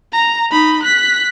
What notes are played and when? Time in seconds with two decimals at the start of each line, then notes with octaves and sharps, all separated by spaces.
0.13 A#5
0.51 D#4 B5
0.83 F#6 B6